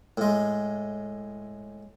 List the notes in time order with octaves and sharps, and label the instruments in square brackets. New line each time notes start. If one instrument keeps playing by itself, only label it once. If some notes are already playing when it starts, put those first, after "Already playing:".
[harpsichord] A2 G#3